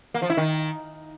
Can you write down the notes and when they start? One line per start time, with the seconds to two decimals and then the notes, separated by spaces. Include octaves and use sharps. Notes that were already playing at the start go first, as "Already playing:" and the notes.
0.14 A#3
0.22 F3
0.30 E4
0.37 D#3